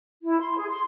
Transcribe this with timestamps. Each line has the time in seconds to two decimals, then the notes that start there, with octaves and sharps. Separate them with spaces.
0.24 E4
0.39 C6
0.56 G#4
0.68 C6